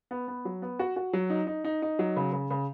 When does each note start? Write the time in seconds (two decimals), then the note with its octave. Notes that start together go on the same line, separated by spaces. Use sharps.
0.11 B3
0.28 B3
0.45 F#3
0.62 B3
0.79 F#4
0.96 F#4
1.13 F#3
1.30 D#4
1.47 D#4
1.64 D#4
1.82 D#4
1.99 F#3
2.17 C#3
2.32 C#3
2.51 C#3